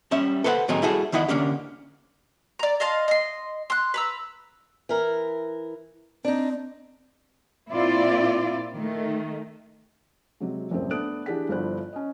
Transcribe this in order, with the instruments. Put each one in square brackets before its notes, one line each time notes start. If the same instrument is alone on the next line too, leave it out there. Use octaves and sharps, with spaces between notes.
[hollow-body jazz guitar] G3 C#4 E5
A4 B4 C5 D#5 F#5
A2 D#3 F#3 C4 D#4 G#4
G3 E4 F#4 G#4 A4
E2 D#3 E4 D#5 F#5
D3 A#3 C#4 D4 G4
[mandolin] D5 A#5
D#5 F5 A5 C6
D#5 C6
C6 F#6
B4 A#5 E6
[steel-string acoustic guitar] E3 A#4
[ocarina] C4 [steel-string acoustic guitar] D4 D#4
[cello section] A#2 C4 E4 F4 D5
D#3 A3
[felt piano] C3 F#3 G#3
F#1 C2 F#2 A2 C4 C5
A3 B3 D4 D#6 F#6 D7
E3 D4 G4 G#4 F#5 B6
G1 F3 E4 C5 D5 F#6
C#4 D#5